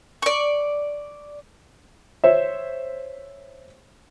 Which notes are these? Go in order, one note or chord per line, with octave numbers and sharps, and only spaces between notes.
D5 C#6
C5 C#5 E5